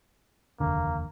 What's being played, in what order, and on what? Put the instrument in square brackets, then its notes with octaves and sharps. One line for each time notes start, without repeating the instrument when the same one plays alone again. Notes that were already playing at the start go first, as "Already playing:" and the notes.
[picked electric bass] F1 D#2 D3 [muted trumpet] A#3